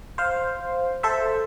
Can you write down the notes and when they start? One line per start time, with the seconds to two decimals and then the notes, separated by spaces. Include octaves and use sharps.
0.18 C5 F5
1.03 A4 C5 E5